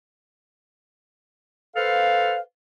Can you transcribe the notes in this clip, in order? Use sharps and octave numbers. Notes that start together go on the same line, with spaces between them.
A4 B4 C5 F5